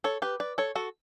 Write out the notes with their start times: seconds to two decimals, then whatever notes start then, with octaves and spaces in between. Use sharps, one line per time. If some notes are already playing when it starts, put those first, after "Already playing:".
0.04 A4 C#5
0.22 G4 B4
0.40 B4 D5
0.58 A4 C#5
0.75 F#4 A4